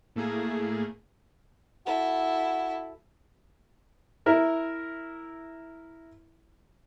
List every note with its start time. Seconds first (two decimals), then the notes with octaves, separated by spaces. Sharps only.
0.16 A2 A3 A#3 G#4
1.86 E4 F#4 A4
4.26 E4 A#4 E5